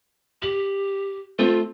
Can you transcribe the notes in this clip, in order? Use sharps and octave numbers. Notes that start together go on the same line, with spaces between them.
G4 F#7
A3 C4 F4